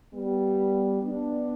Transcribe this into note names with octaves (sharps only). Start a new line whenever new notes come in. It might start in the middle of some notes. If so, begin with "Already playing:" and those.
G3 B3
B3 D4